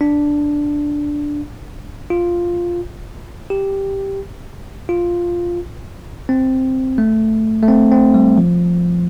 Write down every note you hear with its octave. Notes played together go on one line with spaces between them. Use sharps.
D4
F4
G4
F4
C4
A3
A3
C4
C4
G3
F3